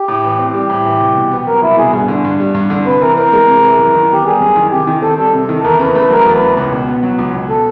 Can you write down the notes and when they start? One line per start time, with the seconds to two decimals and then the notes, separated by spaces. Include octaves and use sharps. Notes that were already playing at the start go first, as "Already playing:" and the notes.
Already playing: G4
0.08 A2
0.24 E3
0.39 C4
0.54 G3 G4
0.70 A2
0.85 E3
1.00 C2
1.16 B2
1.32 B3
1.47 F#3 A#4
1.62 C2 E4
1.78 B2 G#4
1.93 G2
2.08 D3
2.24 G2
2.40 G3
2.54 G2
2.70 D3
2.86 C3 B4
3.01 E3 A#4
3.17 C4 A#4
3.33 G#3
3.48 C3
3.63 E3
3.79 F#2
3.94 D#3
4.10 B3 G4
4.25 G3 G#4
4.40 F#2
4.56 D#3
4.71 C3 G4
4.87 D#3
5.02 C4 A4
5.18 G3 A4
5.33 C3
5.49 D#3
5.64 E2 A#4
5.80 C#3 B4
5.95 A3 B4
6.10 F#3 A#4
6.26 E2
6.33 B4
6.41 C#3
6.57 C#2
6.72 B2
6.88 B3
7.03 F#3
7.18 C#2
7.34 B2
7.50 A4